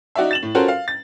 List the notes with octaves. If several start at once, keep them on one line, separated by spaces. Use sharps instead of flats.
D#4 F#4 D5 E5
A6 E7 F#7
A2
C#4 F4 F#4 A4 A#4 C5
F5
A6